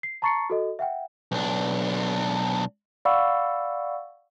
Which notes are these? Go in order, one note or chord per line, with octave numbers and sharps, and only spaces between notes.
C7
A5 A#5 C#6 A6 C7 C#7
F#4 A4 D#5
E5 F#5 G5
B1 D4
D5 F5 F#5 B5 C#6 E6